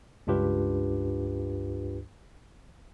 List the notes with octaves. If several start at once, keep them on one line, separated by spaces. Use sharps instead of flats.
C#2 G2 D4 F4 G4 B4